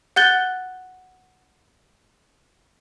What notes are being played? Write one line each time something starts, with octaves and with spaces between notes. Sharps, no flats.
F#5 F#6 G6 A6 G7